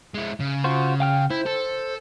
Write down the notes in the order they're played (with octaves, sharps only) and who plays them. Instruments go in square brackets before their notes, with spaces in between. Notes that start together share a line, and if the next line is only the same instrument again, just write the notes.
[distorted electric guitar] G#3 E4
C#3
[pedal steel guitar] F4 F#4 C5
F5 G5 F6
[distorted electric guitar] E4 [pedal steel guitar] C5
[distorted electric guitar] A4